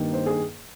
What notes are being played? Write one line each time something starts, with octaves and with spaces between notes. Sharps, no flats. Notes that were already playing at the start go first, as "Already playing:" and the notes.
Already playing: G2 D#3 A#3
C5
G#4